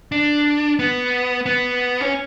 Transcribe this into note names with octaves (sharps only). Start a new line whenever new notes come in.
D4
B3
B3
C#4